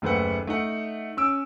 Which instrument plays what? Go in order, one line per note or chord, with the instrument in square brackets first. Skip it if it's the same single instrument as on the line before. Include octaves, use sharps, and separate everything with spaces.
[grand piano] F#1 D#2 A3 B4 C5 F#5
A3 D#4 F#5
C#4 E6 D7